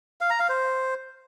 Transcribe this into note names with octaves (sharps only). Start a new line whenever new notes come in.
F5
A#5
F5
C5